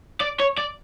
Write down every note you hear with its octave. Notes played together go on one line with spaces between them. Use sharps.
D5
C#5
D5